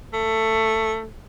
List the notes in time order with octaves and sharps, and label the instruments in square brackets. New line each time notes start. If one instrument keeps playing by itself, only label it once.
[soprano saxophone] A3